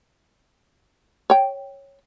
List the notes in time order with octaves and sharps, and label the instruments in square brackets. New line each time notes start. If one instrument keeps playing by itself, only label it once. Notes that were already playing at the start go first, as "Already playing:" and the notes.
[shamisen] C#5 G5